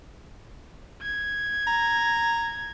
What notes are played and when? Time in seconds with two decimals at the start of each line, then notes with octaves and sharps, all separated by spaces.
1.02 G#6
1.67 A#5